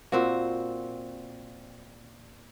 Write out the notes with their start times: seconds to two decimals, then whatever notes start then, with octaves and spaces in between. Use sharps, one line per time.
0.12 A#2 C4 F#4